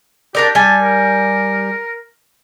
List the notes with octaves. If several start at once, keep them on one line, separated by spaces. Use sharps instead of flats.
D4 G4 A#4 D5
G3 G#5 A5
A#4